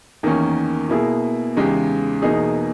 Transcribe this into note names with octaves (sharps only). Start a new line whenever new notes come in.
E2 D#3 A#3 C#4
B2 A#3 E4 G#4
E2 C#3 G#3 D#4 G4
E2 B2 A#3 D#4 G#4